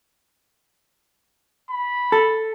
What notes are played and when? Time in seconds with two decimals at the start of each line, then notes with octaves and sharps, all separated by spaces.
1.71 B5
2.12 A4